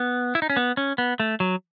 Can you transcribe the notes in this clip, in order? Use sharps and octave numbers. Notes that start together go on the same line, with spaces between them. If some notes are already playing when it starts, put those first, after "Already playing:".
Already playing: B3
E4
D#4
C#4
B3
C#4
B3
A3
F#3